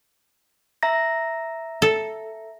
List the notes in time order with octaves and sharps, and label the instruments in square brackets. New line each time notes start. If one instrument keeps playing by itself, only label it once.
[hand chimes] E5 A#5 A#6
[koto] A4